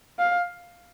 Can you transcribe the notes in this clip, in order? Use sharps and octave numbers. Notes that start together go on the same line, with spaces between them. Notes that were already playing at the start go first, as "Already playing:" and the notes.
F5